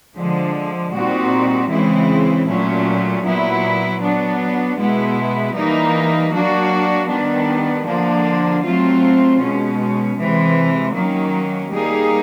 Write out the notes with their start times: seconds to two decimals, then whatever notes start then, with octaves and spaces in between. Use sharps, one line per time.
0.16 D3 F3 G#3
0.93 A#2 G3 C4 D#4 F#4
1.70 C#3 E3 G#3 C4 E4
2.46 A#2 F#3 A3 C#4
3.24 A#2 F#3 B3 E4
4.01 F#3 B3 D4
4.78 B2 G#3 B3 E4
5.54 E3 G3 A#3 D#4
6.31 F#3 A#3 D4 F#4
7.09 D#3 G3 B3 D4
7.86 D3 F3 A#3 D4
8.63 F#3 A3 C4 F4
9.40 B2 G#3 C#4
10.17 C3 E3 G#3
10.93 D#3 F#3 A#3 C#4
11.70 G3 A#3 D#4 G#4